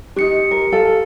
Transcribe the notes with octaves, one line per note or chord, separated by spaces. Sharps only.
D4 D#4 G4 C#7
A#4
A4 F5